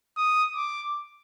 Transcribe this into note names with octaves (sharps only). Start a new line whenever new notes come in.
D#6
D6